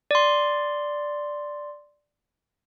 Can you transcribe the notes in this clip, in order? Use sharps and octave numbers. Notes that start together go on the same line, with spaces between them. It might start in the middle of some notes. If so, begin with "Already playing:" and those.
D5 C6